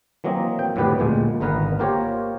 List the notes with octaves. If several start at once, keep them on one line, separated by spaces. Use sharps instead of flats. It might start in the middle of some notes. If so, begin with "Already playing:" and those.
E3 F#3 A#3 C4 D#5
G5
F2 A2 D3 B3 G4 B4
D2 A#2 G#3
G#1 D3 B3 A#4 B4 F#5
A#3 F4 G4 A#4 C5 C#5